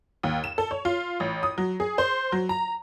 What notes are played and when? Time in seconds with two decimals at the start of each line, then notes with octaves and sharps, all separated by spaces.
0.23 D#2
0.44 E7
0.58 A4
0.71 C#5
0.85 F4
1.20 A1
1.43 D#6
1.58 F#3
1.80 G#4
1.98 C5
2.32 F#3
2.49 A#5